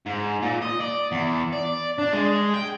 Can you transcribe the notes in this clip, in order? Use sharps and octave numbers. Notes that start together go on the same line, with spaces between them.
G#2
A#2
D#5
D5
E2
D5
D4
G#3
G5